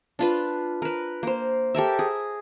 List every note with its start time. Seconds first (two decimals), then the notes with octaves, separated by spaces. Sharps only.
0.19 D4 F4 B4
0.82 A#4 B4
1.23 A#3 C5
1.75 G4 A4 A#4 E5
1.99 G#4